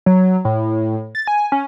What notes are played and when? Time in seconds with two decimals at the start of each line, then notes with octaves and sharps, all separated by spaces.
0.06 F#3
0.45 A2
1.15 A6
1.28 G#5
1.52 C#4